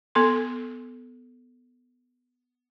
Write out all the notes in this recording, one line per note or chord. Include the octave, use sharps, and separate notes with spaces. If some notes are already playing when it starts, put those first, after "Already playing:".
B3 A4 C6